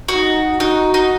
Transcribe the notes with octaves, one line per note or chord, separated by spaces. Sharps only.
F#4
D#4
D#4 F#4
D#4